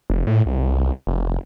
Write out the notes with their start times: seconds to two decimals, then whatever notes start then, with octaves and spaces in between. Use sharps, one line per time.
0.10 F1
0.27 A2
0.46 C2
1.07 F1